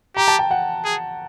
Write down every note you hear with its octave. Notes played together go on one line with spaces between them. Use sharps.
G4 A#5
A5
G5
F#5
G#4